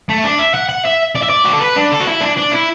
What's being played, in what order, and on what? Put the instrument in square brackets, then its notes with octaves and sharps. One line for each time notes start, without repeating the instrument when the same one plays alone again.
[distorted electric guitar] A3
D4
E5
F#5
F#5
E5
D5
E5
D5
F#4
A4
B4
D4
A4
F#4
E4
D4
D4
E4